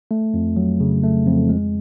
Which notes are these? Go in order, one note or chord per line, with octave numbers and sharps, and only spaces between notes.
A3
F2
F#3
C#3
A3
F2
G#3